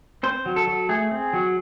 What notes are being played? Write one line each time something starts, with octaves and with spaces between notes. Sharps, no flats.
C4 C5
F#3
A4
F#3
A3 G#4
C4
F#3